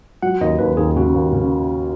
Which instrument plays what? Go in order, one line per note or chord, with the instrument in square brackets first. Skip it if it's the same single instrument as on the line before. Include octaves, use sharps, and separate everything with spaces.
[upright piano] F#3 [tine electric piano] F#5
[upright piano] D#2 [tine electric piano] D#5
[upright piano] D#2 [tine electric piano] B4
[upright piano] D#2 [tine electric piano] G#4
[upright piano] C#3 [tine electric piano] F#4
[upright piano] D#2
C#3